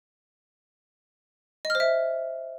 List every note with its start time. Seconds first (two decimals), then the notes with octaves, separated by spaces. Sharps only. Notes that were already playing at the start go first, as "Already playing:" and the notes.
1.65 D#5
1.70 F6
1.75 C5
1.80 E5